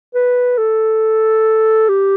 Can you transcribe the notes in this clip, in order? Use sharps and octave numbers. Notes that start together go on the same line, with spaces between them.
B4
A4
G4